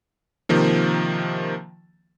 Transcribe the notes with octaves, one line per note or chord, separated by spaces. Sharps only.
C3 D#3 F3 A#3